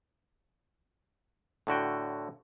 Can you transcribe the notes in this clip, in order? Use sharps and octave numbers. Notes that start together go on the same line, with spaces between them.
A2 D3 F#4 G5